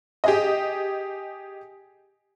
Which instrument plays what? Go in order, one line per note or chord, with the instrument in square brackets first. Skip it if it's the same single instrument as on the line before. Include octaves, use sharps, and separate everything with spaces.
[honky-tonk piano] G4 G#4 D#5